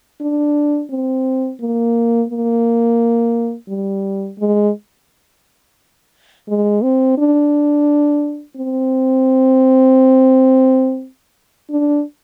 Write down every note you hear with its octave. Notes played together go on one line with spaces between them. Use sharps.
D4
C4
A#3
A#3
G3
G#3
G#3
C4
D4
C4
D4